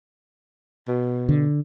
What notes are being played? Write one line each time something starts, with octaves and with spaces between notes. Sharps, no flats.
B2
D3